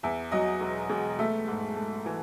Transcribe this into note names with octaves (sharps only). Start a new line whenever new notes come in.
E2 E5
F#3 D#5
E1
E1
A3 E5
G#2
A3
E3